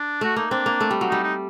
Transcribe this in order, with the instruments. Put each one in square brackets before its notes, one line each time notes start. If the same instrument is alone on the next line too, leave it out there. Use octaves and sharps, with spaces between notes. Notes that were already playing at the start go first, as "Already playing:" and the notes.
Already playing: [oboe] D4
[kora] A3 [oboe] F#4
[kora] A#3 [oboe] D#4
[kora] C4 [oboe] D4
[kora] A#3
A3
G3
F#3
[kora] G3 [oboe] D#4
[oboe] D#4